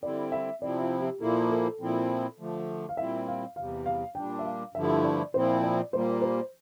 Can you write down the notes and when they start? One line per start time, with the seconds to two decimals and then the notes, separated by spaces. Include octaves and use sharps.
0.03 D3 G3 C4 E4 D5
0.32 E5
0.61 C3 F3 C4 E4 D5
0.81 F4
1.01 G4
1.20 A#2 F3 A#3 E4 A4
1.50 A4
1.80 A#2 F3 C4 E4
2.39 D3 F3 A3
2.89 F5
2.97 A#2 G3 C4 E4 E5
3.28 F5
3.56 E2 C3 G3 F5
3.86 F5
4.15 A#2 G3 D4 G5
4.39 E5
4.46 F5
4.74 G2 D3 F3 A3 E4 E5
5.04 D5
5.34 A#2 F3 C4 E4 C5
5.63 D5
5.93 A#2 G3 A#3 C5
6.22 C5